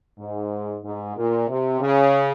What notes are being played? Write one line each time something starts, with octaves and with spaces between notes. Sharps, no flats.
G#2
G#2
A#2
C3
C#3